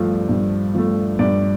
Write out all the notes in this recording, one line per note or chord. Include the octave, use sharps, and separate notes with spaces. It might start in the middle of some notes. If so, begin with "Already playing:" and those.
Already playing: G2 F3 A3
G2
F3 A3
G2 D5